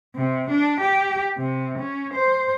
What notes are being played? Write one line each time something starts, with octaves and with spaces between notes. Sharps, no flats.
C3
D4
G4
C3
C#4
C5